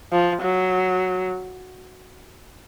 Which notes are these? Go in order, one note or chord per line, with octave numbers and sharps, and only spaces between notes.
F3
F#3